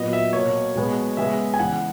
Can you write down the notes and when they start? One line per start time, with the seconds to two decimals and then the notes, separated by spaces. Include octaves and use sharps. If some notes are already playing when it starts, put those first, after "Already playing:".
Already playing: A#2 F#3 B3 D#5
0.13 E5
0.33 B2 A#3 C#5
0.75 B2 G#3 B3
1.17 C#3 G#3 B3 E5
1.54 G#5
1.59 C#3 E3 G#3 F#5